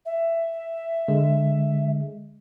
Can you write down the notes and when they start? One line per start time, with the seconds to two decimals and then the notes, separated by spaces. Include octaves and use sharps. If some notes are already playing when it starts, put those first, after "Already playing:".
0.05 E5
1.08 D3 G#3